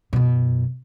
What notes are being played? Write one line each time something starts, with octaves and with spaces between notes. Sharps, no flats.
F#2 B2